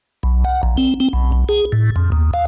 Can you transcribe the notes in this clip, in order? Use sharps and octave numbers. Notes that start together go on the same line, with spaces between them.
B1
F#5
A#1
C4
C4
B1
B1
G#4
A2
F2
D#2
F5